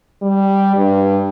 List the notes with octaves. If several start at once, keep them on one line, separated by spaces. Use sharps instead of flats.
G3
G2